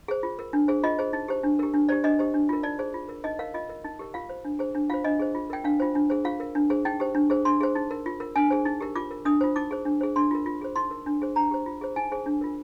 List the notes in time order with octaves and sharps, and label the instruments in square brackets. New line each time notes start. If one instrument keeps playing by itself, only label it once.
[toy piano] G#4 C5
F4
A#4
D4
G#4 C5
F4 D#5
G#4 C5
D#4
G4 C5
D4
G4 A#4
D4
G4 C5 D5
D4 D#5
G4 C5
D4
F4 A#4
D#4 D5
G#4 C5
F4
A#4
D#4 D#5
A#4 F5
F4 D#5
A#4
D#4
G4 A#4
F4 F5
C5
D4
G#4 C5
D4
F4 C5 F5
D4 D#5
G#4 C5
F4
A#4 G5
D4 F5
F4 C5
D4
G#4 C5
F4 F5
A#4
D4
G#4 C5
D#4 G5
G4 C5
D4
G#4 C5
D4 C6
G#4 C5
D#4
A#4
F4
A#4
D4 G#5
G#4 C5
D#4
G4 A#4
F4 D6
A#4
D4 D#6
F4 C5
D#4 D6
G#4 C5
D4
G#4 C5
D4 C6
F4 A#4
F4
G#4 C5
D#4 C6
A#4
D4
G#4 C5
D4 A#5
G4 C5
F4
G#4 C5
D#4 G#5
G#4 C5
D4
F4 A#4